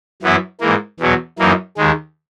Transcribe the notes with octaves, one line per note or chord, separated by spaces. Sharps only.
F#2 E3 B3 E4
G#2 E3 A#3
E2 B2 F#3
F#2 E3 A#3 D#4
D#2 D#3 G#3